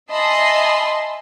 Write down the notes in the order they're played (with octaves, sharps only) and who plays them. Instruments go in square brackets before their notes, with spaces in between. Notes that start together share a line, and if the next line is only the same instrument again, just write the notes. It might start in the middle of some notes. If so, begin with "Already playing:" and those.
[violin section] D#5 E5 G#5 A5 B5 C6